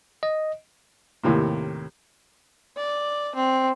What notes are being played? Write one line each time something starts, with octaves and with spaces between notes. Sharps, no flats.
D#5
D#2 A2 C3 A#3
D5
C4